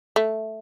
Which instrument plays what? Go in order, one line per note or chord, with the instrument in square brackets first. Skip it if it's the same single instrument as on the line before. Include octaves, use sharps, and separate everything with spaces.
[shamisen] A3